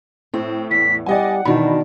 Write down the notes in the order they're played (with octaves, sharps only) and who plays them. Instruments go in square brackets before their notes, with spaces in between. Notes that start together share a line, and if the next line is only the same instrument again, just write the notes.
[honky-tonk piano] A2 [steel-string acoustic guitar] C4
[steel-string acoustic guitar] E2 [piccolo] B6
[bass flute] G3 [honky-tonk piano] D5 D#5 G#5 [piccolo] F#5
[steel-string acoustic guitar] B2 D4 [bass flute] D#3 [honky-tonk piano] E3 F#4 B5